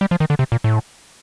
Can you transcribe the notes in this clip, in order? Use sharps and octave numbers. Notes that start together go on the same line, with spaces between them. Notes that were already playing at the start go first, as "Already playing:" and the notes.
G3
F3
D#3
D3
C3
A#2
A2